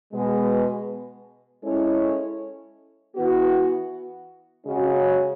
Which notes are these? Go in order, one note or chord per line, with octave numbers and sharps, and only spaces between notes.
B2 G#3 B3
G#3 C#4 E4 A4 C#5
E3 B3 F#4
C#3 G#3 C#4 F#4